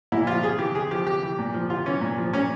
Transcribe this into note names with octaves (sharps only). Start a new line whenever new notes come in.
A#2 E4
F3 F4
C3 G#4
E3 G4
C3 G#4
F3 G4
C3 G4
E3
A#2
F3
C3 F4
E3 C#4
A#2
F3
A#2 C#4